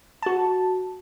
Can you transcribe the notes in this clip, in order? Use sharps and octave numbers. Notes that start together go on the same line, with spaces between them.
F#4 A5